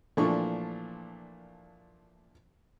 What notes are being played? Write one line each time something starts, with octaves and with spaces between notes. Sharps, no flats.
A#2 E3 F3 A3 D4 C#6